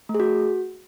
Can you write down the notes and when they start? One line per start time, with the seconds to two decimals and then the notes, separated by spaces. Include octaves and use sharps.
0.09 A3
0.14 G#4
0.20 F#4